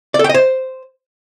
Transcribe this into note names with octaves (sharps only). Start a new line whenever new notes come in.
D5
A4
G5
D#5
C5